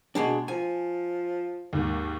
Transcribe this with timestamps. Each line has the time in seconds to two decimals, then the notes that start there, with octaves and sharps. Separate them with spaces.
0.15 B2 G#3 D4
0.48 F3 G#5
1.73 D#2 G#2